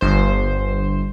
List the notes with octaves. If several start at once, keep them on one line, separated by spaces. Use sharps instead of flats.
G1 C5